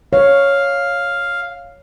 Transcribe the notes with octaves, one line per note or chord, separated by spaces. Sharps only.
C#5 F5